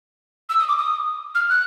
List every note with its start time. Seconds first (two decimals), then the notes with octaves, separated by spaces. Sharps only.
0.49 E6
0.59 D#6
0.69 D6
0.78 D#6
1.35 F6
1.50 F#6